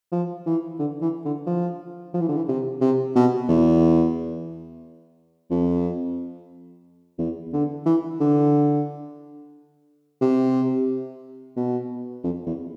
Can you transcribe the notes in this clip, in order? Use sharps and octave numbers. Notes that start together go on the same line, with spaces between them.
F3
E3
D3
E3
D3
F3
F3
E3
D3
E3
C3
C3
B2
E2
F2
E2
D3
E3
D3
C3
B2
F2
E2